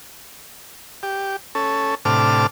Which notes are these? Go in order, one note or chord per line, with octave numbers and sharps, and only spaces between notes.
G4
C#4 A4
A2 C3 D4 A5 D6 F6